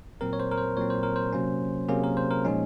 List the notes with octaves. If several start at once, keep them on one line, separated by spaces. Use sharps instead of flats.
A#2 F#3 C4 A#4
C#5
C5
A#4
C5
A#2 F#3 C4 C#5
C5
A#4
C5
C3 F#3 A#3 C#4
C3 F#3 A#3 C#4 G#4
A#4
C5
A#4
A#2 F3 G#3 C#4 D#4